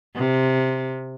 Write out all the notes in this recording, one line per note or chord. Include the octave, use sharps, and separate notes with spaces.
C3